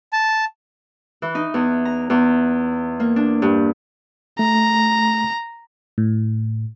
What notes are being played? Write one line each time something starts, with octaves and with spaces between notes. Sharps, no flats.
A5
E3
D#4
E2
A#5
E2
A#3
D4
G2
A3 A#5
A2